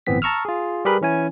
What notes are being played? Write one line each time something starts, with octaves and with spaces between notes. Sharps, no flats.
G1 A2 E3 B3 C4 B6
A5 A#5 C#6 E6 F6
F4 G#4
G3 G4 G#4 A#4 B4 B5
E3 C#4 E4 G#5